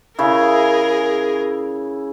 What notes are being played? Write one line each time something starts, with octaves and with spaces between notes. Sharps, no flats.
C#3 E4 G#4 A#4